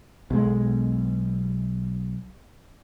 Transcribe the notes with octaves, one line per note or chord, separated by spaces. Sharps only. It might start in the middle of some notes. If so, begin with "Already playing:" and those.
B1 G#3